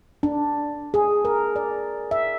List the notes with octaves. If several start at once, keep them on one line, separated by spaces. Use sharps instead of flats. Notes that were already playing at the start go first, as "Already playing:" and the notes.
D4
G#4
A#4
D5
E5